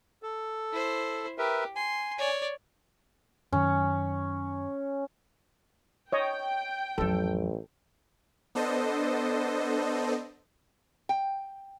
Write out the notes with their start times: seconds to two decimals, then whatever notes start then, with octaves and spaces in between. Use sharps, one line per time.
0.23 A4
0.72 E4 C5
1.38 G4 A#4 B4 E5
1.75 G#5 C6
2.18 C#5 D5
3.52 F#2 D#3 C#4
6.12 C#5 D#5 G5
6.98 A1 F2 F#3 A4
8.55 B3 D4 A4 C5 D#5
11.09 G5